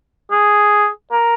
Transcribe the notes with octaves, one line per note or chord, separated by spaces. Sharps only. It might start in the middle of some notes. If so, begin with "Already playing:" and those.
G#4
A#4